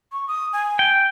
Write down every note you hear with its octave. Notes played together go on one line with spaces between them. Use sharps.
C#6
D#6
G#5
G5